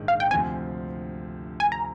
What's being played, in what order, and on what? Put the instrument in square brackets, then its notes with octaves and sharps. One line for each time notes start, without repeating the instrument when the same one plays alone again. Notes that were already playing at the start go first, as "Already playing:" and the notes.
Already playing: [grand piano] A#1 G#2 D#3 G#3 D4
[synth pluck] F5
G5
[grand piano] D2 C3 F3 C4 [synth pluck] G#5
[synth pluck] G#5
A#5